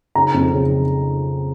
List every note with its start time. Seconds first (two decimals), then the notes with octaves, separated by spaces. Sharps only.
0.15 C#3 A#5
0.34 F2
0.53 C#3